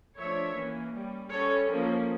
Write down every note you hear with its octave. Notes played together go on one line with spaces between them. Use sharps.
F3 A3 D4 C#5 E5
E3 A#3 C#4
G3 C#4
G3 C#4 A4 C#5
F3 A#3 C#4